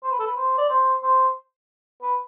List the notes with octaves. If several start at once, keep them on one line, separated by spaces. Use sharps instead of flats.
C5
B4
A4
B4
C5
D5
C5
C5
B4